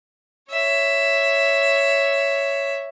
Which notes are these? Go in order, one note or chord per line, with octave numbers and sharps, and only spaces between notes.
C#5 E5